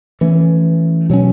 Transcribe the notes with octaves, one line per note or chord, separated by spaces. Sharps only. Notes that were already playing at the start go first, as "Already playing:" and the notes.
E3 A3 C#4
B2 F#3 C#4